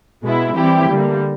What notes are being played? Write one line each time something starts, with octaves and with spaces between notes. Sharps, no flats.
B2 G#3 B3 E4
E3 G3 C4 E4 G4
D3 G3 A#3